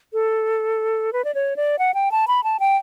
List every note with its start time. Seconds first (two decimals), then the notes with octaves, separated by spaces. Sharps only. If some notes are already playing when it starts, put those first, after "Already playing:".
0.13 A4
1.13 B4
1.24 D5
1.35 C#5
1.56 D5
1.79 F#5
1.94 G5
2.12 A5
2.28 B5
2.44 A5
2.60 G5